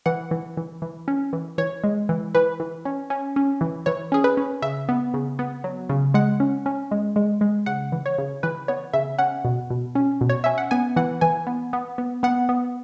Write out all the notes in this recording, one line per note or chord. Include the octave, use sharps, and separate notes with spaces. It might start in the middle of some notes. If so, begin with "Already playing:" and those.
E3 F#5
E3
E3
E3
C#4
E3
E3 C#5
G#3
E3
E3 B4
E3
C#4
C#4
C#4
E3
E3 C#5
C#4 G#4
B4
C#4
C#3 E5
B3
C#3
B3
F#3
C#3
G#3 F#5
C#4
C#4
G#3
G#3
G#3
C#3 F#5
E3
C#5
C#3
E3 B4
B3 C#5
C#3 E5
C#4 F#5
B2
B2
C#4
B2
C#5
C#4 E5
F#5
B3 G#5
E3 F#5
E3 G#5
B3
B3
B3
B3 F#5
B3